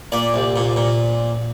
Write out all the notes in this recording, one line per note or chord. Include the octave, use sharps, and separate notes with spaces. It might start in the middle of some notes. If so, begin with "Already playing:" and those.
A#2 D5
C2
A#2
A#2